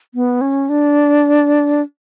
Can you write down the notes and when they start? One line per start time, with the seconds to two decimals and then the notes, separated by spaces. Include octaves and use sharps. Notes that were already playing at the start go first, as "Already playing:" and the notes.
0.15 B3
0.41 C#4
0.69 D4